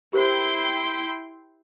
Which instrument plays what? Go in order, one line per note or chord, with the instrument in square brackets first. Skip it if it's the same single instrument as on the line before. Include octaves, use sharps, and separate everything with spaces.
[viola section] E4 G5 C6 [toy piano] G4 A#4 C5